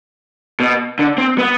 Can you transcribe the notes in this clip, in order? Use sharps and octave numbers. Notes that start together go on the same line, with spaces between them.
B2
D3
C4
B3